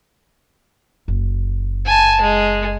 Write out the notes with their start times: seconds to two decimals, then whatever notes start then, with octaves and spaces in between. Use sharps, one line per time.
1.08 F#1
1.85 G#5 A5
2.21 G#3